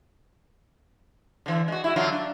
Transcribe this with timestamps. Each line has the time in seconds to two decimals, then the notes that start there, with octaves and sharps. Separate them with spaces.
1.46 D3 E3
1.68 G#3 F#4
1.84 E4 F#4
1.96 D3 F#3 F4
2.12 D4